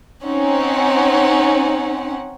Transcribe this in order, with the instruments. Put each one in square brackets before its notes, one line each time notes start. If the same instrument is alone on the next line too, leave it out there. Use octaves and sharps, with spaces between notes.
[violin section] C4 C#4 D#4 F#5